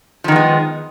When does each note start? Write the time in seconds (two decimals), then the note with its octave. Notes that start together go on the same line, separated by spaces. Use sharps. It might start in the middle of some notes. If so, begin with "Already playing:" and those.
0.24 F3
0.28 D#3
0.32 B3
0.36 G#3